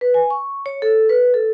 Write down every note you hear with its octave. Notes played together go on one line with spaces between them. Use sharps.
B4
G#5
C#6
C#5
A4
B4
A4